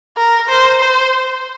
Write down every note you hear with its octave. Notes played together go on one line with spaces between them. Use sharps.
A#4
C5
C5